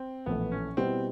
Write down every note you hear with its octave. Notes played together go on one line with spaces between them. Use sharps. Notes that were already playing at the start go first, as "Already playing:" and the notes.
Already playing: C4
A#1 A2 E3 A3 B3
C#4
B2 G3 B3 C4 E4